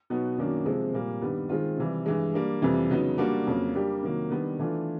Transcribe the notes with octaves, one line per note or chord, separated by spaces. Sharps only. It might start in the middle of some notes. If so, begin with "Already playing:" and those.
B2 F#3 B3 D#4 F#4
F#2 D#3 F#3 A#3 D4
C3 F3 G#3 C4
A#2 G3 A#3
G2 D#3 G3 B3
D#3 G#3 C4 F4
C3 E3 G3
G2 E3 G#3
G3 A#3 D4
F2 C3 E3 G3
C#3 F#3 B3 D#4
G3 A#3 D4 F#4
F2 C#3 F#3 A#3
G3 A#3 D4 G4
C3 D#3 F#3 A#3
D#3 G3 B3 D4
E3 A3 D4 F4